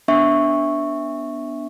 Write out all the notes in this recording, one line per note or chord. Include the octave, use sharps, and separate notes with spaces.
B3 D4 E5 C#6